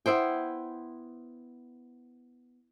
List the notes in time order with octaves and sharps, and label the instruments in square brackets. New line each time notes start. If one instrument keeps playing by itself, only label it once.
[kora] B3 E4 C5 G5